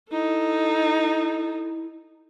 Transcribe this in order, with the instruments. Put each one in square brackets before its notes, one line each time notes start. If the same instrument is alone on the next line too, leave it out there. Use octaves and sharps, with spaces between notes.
[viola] D#4 A4 [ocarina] E4